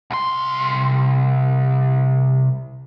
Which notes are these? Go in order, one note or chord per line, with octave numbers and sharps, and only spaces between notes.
C2 C6